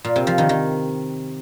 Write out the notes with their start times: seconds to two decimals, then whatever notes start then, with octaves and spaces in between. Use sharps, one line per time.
0.04 A#2
0.16 C3
0.27 F3
0.38 D#3
0.49 D#3